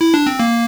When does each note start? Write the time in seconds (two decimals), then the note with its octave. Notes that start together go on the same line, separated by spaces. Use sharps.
0.01 E4
0.14 D4
0.26 C4
0.40 A#3